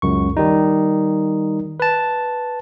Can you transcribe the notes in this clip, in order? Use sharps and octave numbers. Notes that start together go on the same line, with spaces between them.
C#2 F#2 C#6
D#3 G3 D#4
B4 A5